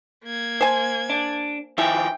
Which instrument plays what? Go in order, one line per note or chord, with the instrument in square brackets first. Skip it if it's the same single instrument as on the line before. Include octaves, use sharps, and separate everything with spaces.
[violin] A#3 G#6
[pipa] C5 G#5
[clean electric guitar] D4
[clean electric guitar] D#3 F3 G#5 [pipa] E4 [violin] G5